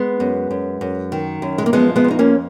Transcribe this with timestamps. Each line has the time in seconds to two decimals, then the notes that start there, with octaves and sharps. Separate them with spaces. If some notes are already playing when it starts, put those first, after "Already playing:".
Already playing: G#3 B3
0.20 F#2
0.51 F#2
0.81 F#2
1.12 D#3
1.42 F#2
1.58 G#3
1.66 A#3
1.73 F3 G#3 B3
1.96 G#3 B3
2.04 F2
2.11 D#4
2.19 A#3 C#4